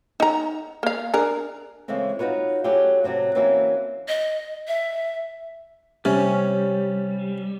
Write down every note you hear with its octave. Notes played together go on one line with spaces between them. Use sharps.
D#4 A#5
A#3 F5
D4 G#4 A#4
C#3 E3 G#3 A3 C4
D#4 F4 F#4 B4 C#5
F#3 A3 C#4 E4 F4 G4
A2 C3 F#3 C4
E3 F#3 A#3 C4 C#4 E4
D#5
E5
C3 G3 C#4